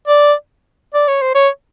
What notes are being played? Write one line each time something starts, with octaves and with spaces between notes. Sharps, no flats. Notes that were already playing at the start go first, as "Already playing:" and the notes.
D5
D5
C#5
C5
C#5